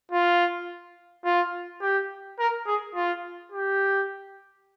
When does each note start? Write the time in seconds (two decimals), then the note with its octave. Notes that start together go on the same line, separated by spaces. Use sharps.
0.11 F4
1.25 F4
1.81 G4
2.39 A#4
2.67 G#4
2.95 F4
3.52 G4